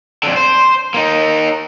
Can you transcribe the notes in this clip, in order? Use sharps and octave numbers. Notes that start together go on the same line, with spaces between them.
F2 D3
C5
A#3 D#4